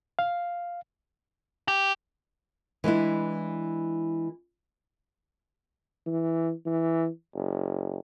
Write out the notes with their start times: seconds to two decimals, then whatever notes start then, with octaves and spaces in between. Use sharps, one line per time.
0.19 F5
1.68 G4
2.84 E3 G#3 D4 E4
6.06 E3
6.66 E3
7.34 F#1